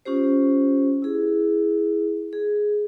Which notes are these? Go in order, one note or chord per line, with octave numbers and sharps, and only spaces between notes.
C#4 F4 G4 C5
E4 G#4
G#4